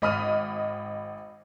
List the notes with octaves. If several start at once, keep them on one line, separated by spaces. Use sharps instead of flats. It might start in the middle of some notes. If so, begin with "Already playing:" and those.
G#1 D#5 B5 D#6 F6 D#7